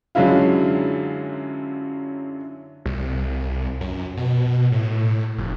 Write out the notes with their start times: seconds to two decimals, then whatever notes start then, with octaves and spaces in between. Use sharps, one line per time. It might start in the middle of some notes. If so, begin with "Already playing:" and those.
0.15 F#2 D3 F#3 G#3 E4 F4
2.86 C2
3.81 F#2
4.17 B2
4.72 A2
5.38 F1